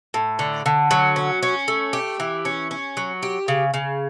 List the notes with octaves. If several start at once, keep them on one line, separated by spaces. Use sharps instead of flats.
A2
D3
D3
F#3
C#4
C#4
A3
G4
E3
C#4
C#4
F#3
G4
C#3
C#3